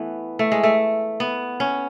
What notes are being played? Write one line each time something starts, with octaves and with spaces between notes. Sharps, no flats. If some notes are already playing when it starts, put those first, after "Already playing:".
Already playing: E3 A3 B3
A3
G#3
A3
B3
C#4